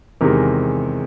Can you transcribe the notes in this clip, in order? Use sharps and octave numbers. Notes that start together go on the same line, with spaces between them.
E2 C3 D#3 G#3 A#4